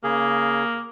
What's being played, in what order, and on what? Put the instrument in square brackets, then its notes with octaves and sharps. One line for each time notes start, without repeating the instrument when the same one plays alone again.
[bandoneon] C#3 G#4 [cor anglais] A#3